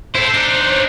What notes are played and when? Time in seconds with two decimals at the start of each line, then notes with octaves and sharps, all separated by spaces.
0.15 E4 A4 C5
0.34 D4 D#4